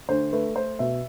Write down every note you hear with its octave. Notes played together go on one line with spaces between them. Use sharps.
D2 C5
A3 B4
A3 C5
B2 E5